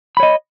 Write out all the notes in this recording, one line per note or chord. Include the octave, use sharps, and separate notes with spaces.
C#5 D#5 B5